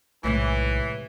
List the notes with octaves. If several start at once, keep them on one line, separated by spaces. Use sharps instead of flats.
B1 A2 C3 E3 G#3